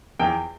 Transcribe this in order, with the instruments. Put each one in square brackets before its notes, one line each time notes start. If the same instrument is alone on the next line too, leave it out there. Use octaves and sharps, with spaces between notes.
[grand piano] E2 G5